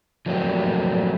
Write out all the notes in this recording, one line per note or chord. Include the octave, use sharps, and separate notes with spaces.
F3 F#3 A3 A#3 C4 G4